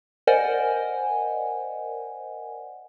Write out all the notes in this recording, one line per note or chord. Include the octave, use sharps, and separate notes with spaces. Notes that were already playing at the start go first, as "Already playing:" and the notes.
A#4 C5 D5 D#5 F#5 G#5